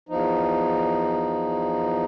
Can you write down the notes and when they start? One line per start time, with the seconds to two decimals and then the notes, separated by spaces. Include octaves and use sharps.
0.09 E2 F3 D#4